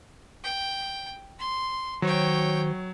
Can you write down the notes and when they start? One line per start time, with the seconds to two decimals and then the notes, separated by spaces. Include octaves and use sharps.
0.44 G5
1.39 C6
2.02 D#3 F#3 F#4 C5 C#5 G5